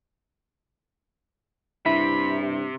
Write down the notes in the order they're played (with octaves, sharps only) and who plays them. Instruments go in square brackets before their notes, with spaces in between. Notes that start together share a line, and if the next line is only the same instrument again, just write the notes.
[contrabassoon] G2 [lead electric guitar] C3 [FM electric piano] E4 [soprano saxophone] B5